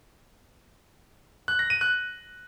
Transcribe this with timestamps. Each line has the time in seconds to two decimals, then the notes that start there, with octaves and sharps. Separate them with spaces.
1.48 F#6
1.59 A#6
1.70 D#7
1.81 F#6